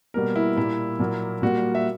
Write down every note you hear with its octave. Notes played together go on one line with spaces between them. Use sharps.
B2 G3 A#3 A#4
E4
A#2 G3 A#3 E4
A#2 F#3 A#3
A#2 G3 A#3 F#4
E5